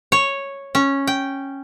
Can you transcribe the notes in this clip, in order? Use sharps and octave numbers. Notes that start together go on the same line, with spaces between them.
C#5
C#4
G5